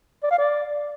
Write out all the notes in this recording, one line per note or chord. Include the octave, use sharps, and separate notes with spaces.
D5
F5
D5